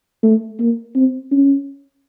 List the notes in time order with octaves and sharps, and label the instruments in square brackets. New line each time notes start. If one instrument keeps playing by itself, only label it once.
[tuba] A3
A#3
C4
C#4